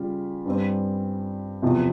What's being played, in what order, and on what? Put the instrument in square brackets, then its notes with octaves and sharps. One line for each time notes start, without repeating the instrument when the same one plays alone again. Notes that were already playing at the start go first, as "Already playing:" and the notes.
Already playing: [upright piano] C#3 G3 F4
G2 G3 C4
E2 C3 F3